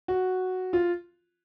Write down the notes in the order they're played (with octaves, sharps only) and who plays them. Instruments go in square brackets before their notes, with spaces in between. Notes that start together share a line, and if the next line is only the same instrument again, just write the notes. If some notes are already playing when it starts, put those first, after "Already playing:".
[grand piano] F#4
F4